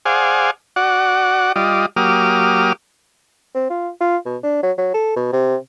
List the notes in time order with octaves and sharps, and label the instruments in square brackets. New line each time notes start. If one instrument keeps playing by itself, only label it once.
[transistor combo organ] G#4 C5 D5 F5 F#5 G#5
F#4 D5 F#5
G3 F4 D5 D#5
F#3 A#3 G4 D6 D#6 F6
[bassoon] C4
F4
F4
B2
D4
F#3
F#3
A4
B2
C3